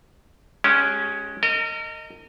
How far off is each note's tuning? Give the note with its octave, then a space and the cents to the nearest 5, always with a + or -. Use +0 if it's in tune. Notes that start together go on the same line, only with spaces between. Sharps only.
G#3 +15 C#4 +0 G4 -20
A#4 -35 D#5 +0